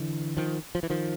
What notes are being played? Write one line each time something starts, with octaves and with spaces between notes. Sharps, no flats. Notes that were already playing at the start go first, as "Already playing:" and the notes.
Already playing: D3 E3
D#3 F3
F3
E3
D#3 F3